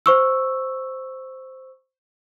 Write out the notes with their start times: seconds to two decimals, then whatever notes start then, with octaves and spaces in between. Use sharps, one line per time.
0.06 C5 C#6 E6